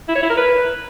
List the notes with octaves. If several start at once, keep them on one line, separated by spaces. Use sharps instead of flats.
E4
C#5
E4
A#4
B4